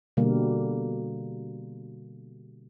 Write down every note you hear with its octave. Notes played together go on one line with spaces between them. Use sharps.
B2 D3 G3 A#3